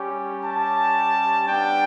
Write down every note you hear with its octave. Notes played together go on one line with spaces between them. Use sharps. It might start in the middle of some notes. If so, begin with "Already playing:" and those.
Already playing: G3 C#4 G4
A5
G3 B3 D4 G4 G5